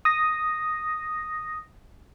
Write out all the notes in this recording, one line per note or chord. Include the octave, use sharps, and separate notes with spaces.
D#6 A#6